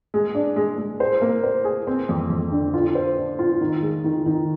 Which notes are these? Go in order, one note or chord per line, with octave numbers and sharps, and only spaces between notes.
G#3
D4
G#3
G#3
C5
A#3
C5
G#4
C4
F2
F2
D3
F4
C5
D4
F4
D#3
G#3
D#3
D#3